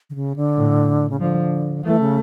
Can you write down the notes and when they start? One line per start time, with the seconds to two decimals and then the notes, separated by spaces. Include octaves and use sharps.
0.10 D3
0.15 C#3
0.36 D3
0.57 A2
1.10 C#3
1.20 D3 F3
1.85 E3 A3
2.00 C#3